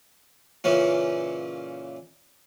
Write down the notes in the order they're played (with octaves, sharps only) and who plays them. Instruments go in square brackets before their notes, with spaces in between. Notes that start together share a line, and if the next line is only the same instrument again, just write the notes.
[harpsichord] A#2 C#3 E3 C#4